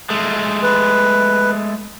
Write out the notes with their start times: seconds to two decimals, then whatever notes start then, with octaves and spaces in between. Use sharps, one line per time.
0.10 G#3 A3
0.63 B4